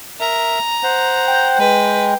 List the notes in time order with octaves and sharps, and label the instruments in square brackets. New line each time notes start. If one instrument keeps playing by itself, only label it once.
[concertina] A#4 E5 [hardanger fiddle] A#5
[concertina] C5 F#5
[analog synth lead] G5
[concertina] G#3 [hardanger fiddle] B4